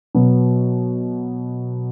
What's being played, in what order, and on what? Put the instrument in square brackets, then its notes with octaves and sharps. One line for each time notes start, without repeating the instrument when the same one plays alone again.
[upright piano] B2 F#3 B3